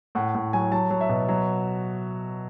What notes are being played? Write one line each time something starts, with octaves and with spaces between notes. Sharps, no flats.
A2 F#5
A2
F#3 G#5
F#3 A5
F#3
E5
B2
F#3